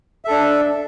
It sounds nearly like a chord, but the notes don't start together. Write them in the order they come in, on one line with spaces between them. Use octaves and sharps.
E5 A4 D4